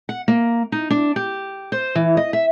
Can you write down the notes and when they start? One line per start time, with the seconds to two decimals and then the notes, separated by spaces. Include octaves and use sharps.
0.09 F#5
0.28 A#3
0.72 D#4
0.90 D4
1.16 G4
1.72 C5
1.95 E3
2.17 D#5
2.33 E5